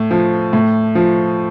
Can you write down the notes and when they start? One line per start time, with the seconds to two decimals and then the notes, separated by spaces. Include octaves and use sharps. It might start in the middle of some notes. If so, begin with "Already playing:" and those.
Already playing: A2
0.11 F3
0.53 A2
0.95 F3